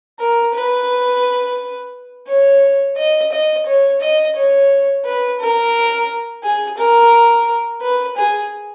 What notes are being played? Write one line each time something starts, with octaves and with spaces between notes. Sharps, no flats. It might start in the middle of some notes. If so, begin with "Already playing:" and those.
A#4
B4
C#5
D#5
D#5
C#5
D#5
C#5
B4
A#4
G#4
A#4
B4
G#4